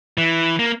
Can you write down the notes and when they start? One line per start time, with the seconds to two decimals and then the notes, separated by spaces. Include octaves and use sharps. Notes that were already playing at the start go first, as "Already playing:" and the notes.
0.18 E3
0.59 A#3